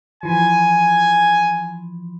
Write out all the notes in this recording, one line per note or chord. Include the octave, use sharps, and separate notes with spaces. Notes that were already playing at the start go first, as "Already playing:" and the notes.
E3 F3 G#5